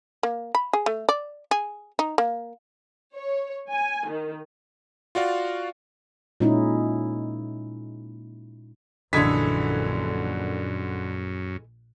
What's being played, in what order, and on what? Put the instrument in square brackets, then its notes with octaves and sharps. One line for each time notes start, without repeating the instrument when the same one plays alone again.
[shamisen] A#3
B5
G#4
A3
D5
G#4
D#4
A#3
[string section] C#5
G#5
D#3
[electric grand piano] F4 F#4 D5 F5
[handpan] A#2 G#3 C#4 D#4 E4
[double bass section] A#1 [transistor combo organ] F#2 [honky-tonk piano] D3 G#6 B6 [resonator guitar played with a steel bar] E3 G#3 A4